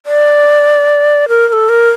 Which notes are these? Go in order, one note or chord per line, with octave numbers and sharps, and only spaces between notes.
D5
A#4
A#4
A4
A#4